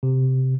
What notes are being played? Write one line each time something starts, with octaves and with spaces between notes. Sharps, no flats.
C3